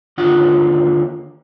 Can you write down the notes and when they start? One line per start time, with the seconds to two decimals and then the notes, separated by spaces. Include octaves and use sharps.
0.18 D#2 D3 F4 F#5